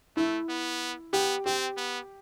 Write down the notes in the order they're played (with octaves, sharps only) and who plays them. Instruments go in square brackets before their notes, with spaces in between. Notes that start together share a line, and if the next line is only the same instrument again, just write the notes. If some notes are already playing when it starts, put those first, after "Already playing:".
[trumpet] A3 [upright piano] E4
[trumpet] B3
[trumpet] B3 [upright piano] G4
[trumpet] C4 [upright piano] G4
[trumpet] B3